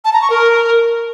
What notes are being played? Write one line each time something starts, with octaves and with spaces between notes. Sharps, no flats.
A5
A#5
C#6
A#4